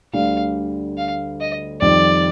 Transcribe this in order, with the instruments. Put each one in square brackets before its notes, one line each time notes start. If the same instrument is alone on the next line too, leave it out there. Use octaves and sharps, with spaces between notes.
[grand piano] D2 D3 G3 [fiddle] F5
[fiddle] F5
D#5
[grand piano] F2 D#3 G3 [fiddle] D5